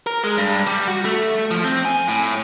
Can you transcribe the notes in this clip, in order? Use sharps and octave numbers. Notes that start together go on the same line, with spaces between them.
A#4
G#3
G2
G3
F#4
A3
F3
C4
G#5
A2